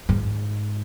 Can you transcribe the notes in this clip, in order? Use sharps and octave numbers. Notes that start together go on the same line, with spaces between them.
G#2